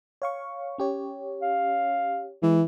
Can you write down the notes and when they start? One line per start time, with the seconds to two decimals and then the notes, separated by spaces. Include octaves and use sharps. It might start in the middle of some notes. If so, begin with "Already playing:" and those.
0.22 C#5 F5 C#6
0.78 C#4 G4 C#5
1.42 F5
2.43 E3 G#3